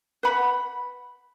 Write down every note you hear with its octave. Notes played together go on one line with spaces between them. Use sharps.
B4 F#5 B5